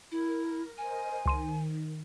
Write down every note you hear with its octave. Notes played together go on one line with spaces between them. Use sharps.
E4 A#4
A#4 C5 D#5 G#5
C#2 D#3 C6 D#7